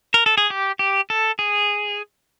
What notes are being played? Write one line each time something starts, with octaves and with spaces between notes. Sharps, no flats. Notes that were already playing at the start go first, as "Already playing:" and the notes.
A#4
A4
G#4
G4
G4
A4
G#4